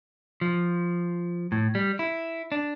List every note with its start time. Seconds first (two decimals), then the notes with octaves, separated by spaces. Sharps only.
0.41 F3
1.52 A2
1.75 G3
1.99 E4
2.52 D4